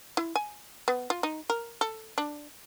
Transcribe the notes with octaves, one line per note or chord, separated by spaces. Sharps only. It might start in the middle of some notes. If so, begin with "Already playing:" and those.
E4
G#5
B3
F4
D#4
A#4
A4
D4